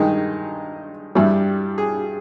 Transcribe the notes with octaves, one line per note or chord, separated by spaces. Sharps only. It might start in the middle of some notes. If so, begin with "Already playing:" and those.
Already playing: G2 D#3 G#3 D#4
G2 G3 E4
G#4